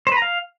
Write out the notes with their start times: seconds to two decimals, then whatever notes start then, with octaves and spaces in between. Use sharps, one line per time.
0.07 C5
0.12 B4
0.17 A#5
0.22 F5